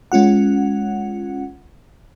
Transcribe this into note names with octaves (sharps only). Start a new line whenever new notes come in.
G#3 C#4 F4 F#5